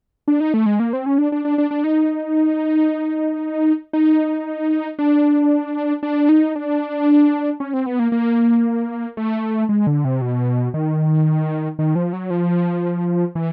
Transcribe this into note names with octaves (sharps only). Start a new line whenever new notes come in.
D4
D#4
A3
G#3
A#3
C4
C#4
D4
D4
D4
D4
D4
D#4
D#4
D4
D4
D#4
D4
C#4
C4
B3
A#3
A#3
A3
G#3
D3
C3
B2
D#3
D#3
F3
F#3
F3
E3